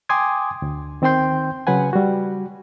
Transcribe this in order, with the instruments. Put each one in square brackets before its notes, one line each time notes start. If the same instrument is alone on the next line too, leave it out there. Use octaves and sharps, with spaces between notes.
[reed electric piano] G5 G#5 C6 D6 D#6 G#6
D2
D#3 C4 C5 G5 C6 G6
C#3 F#3 B4 F#5 G#5
G3 F#4